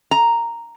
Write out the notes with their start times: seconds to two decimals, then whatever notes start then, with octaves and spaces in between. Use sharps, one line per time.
0.11 A#5